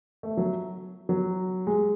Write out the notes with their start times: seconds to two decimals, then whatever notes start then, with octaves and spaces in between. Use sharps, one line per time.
0.23 A3
0.37 F#3
1.09 F#3
1.67 G#3